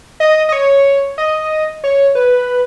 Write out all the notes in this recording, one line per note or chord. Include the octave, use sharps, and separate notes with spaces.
D#5
D#5
C#5
D#5
C#5
B4